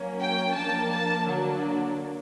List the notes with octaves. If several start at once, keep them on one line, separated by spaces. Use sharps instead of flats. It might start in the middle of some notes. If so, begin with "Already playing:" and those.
Already playing: F#3 A#3 C#4
G5
F3 A#3 D4 A5
A5
D3 F#3 A#3 D4